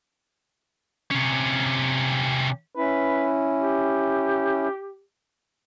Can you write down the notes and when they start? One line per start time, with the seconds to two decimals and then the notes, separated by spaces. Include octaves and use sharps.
1.11 C3 C#4
2.75 C#4 E4 B4
3.59 G4